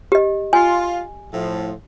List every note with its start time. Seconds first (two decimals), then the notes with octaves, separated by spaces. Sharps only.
0.12 G4 D#5
0.53 F4 G#5
1.33 A2 F3